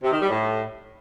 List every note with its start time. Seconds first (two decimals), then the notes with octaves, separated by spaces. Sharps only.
0.03 C3
0.12 D#3
0.21 G3
0.29 A2